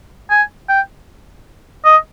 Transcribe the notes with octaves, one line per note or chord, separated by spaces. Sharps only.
G#5
G5
D#5